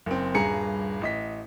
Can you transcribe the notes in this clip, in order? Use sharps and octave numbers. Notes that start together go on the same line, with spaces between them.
F#1 C4
D#1 G2 G#4 A#5 C#7
A1 D#5 B6